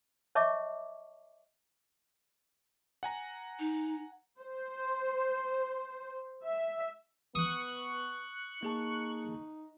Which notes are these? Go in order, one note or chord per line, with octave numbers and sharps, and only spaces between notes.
C#5 D#5 E5 A5 C#6 D6
F#5 G#5 A#5
D#4
C5
E5
B3 C#6 D#6 F#6
A#3 D#4 G#4 A5